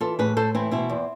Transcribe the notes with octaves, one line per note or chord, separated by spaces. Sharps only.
E3 F4 A4
A2 G#4 B4
A2 A4 C5
E3 C4 E4
B2 C4 E4
E2